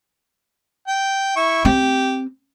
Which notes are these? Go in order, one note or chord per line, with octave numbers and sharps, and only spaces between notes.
G5
E4 C#6
C4 G4